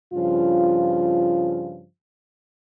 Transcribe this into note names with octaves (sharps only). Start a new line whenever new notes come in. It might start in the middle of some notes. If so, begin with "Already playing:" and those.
G2 C#3 F3 F4